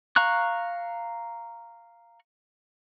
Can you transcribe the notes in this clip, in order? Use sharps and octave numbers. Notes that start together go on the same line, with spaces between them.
F5 A#5 C#6 F#6